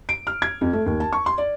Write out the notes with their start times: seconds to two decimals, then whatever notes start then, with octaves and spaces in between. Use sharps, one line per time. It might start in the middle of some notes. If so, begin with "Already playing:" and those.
0.09 D7
0.27 F6
0.42 G#6
0.61 F2
0.73 A3
0.86 D#2
1.00 A5
1.13 C#6
1.26 C6
1.38 D5